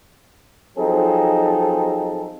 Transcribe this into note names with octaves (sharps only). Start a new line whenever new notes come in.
F3 F#3 C4 D#4 G#4 A4